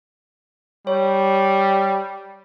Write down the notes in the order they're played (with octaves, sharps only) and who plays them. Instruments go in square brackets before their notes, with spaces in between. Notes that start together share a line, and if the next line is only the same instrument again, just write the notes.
[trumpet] G3 [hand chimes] C#5